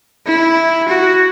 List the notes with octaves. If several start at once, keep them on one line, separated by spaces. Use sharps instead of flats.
E4
F#4